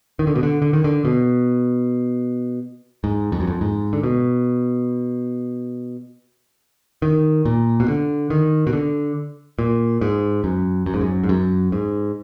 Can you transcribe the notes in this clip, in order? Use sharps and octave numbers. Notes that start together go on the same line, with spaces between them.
D#3
D3
B2
D3
D3
D#3
D3
B2
G#2
F2
F#2
F2
G#2
D3
B2
D#3
A#2
B2
D3
D#3
B2
D3
A#2
G#2
F#2
F#2
G#2
F#2
G#2
F#2
G#2